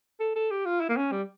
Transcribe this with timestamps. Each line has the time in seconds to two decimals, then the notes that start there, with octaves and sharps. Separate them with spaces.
0.20 A4
0.36 A4
0.51 G4
0.65 F4
0.81 E4
0.89 A#3
0.97 C#4
1.12 G3